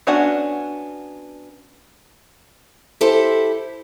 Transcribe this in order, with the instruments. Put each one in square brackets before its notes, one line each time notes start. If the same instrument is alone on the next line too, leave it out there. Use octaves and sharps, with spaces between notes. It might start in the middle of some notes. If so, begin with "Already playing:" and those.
[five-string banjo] B3 C#4 D4 F#4 F#5
[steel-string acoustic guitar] E4 G4 A4 C5